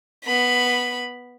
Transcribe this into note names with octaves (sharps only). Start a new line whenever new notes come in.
B3 B5